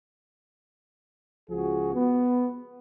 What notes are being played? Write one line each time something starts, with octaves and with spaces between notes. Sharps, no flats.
C#2 F3 F#4 G#4
B3